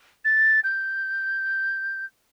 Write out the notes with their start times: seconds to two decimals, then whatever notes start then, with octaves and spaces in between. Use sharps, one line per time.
0.25 A6
0.64 G6